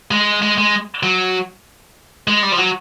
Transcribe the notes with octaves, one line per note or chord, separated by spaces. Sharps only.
G#3
G#3
G#3
F#3
G#3
G3
F3
F#3